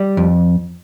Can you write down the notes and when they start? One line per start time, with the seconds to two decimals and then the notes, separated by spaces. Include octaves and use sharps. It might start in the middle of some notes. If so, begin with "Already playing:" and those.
Already playing: G3 D5
0.17 F2